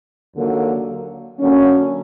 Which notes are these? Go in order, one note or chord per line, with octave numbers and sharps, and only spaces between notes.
D#2 D3 F#3 A#3
D3 F#3 A#3 C#4